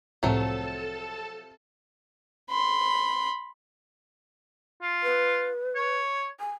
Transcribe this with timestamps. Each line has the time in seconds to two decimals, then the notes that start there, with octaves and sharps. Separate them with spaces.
0.23 C2 A2 C3 F3 F#3 A3 A4 A5
2.50 B5 C6
4.82 F4
5.03 B4
5.75 C#5
6.40 G#5